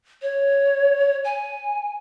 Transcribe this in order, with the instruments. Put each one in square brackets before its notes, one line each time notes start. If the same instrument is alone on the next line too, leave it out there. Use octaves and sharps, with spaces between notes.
[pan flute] C#5
G#5